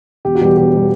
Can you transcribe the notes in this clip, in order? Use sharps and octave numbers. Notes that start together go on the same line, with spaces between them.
E1 G4
F#4
E2 B2 G3 G4
E1 G4
B2 G3